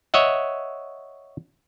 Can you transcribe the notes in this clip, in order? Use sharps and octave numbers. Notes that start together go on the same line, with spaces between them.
C#5 D#5 E5 F#5